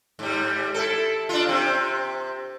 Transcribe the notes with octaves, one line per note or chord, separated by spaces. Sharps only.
G#2 G3
E4 A4
D4 F4
C3 C4